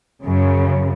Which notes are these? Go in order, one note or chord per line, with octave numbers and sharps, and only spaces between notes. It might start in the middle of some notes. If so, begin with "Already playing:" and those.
F#2 C#3